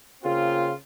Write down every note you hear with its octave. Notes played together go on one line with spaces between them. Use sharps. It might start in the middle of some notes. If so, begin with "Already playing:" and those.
C#3 A#3 C4 F4